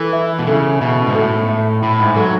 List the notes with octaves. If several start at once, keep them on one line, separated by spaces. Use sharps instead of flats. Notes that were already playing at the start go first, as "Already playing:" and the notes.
Already playing: E3 A4
E5
B2
C#3 A4
B2 E5
G#2
A2 A4
E5
A2 B5
G#2
F#3 A4